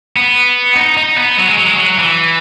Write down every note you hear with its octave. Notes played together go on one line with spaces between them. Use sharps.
B3
D#4
D#4
B3
F#3
G#3
F#3
G#3
F#3
E3